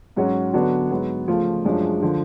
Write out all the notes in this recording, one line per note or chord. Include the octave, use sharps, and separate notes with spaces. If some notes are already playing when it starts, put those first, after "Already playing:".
G#2 F#3 C#4 F#4
D3 F#3 B3 D4 F#4
G#2 F#3 B3
C#3 F3 A3 F4
F#2 F3 G#3 D4
D3 F3